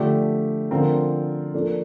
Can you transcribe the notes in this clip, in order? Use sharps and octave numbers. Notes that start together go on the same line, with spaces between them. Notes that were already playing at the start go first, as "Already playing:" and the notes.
Already playing: D3 F3 A3 D4 G4
D3 F3 C4 F4 A#4
F3 A#3 D4 A4